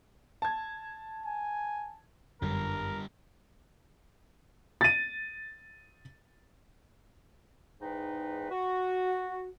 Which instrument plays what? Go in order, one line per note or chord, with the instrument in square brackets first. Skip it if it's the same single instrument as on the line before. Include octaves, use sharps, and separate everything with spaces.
[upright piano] A5 G#6
[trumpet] G#5
[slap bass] G1 [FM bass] F#2 [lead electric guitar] D3 G3 [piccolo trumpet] A#4
[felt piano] A6 D#7
[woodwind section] E2 G#2 D#4 B4 G5
F#4